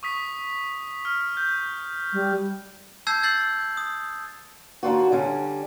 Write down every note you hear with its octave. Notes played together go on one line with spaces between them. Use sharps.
C#6 D#6 B6
F6
G6
G3
A5 E6 G6 G#6 C7
G6 A6 C7 F#7
D#6
D#2 D4 F4 F#4
D3 G3 C#4